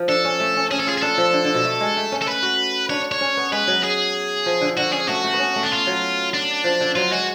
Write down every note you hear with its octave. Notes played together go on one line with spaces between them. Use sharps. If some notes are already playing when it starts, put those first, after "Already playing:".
Already playing: F3
D4 A4
C#4
A3
C#4
C#4 G#4
A4
F4 G#4
G#4
D4 A4
F3
D3
D3
B2
A3
G#3
A3
C#4
A4
B4
F#4
D4 C#5
C#5
C#4
B3
G#3 B4
F#3
G#4
F3
D3
D3 F#4
C#4 G#4
A3 F#4
A3
B3
C#4
A3
D4
F4
F#3
D4
F3
D3
F#3 F4
G#3 F#4